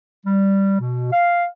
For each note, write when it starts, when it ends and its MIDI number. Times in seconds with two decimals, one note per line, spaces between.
0.25 0.77 55
0.80 1.10 47
1.12 1.45 77